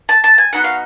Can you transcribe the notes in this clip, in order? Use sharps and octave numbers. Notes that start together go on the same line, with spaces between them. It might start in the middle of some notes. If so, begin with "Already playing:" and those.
A5
A5
G#5
B3 D#4 F#4 F#5
F5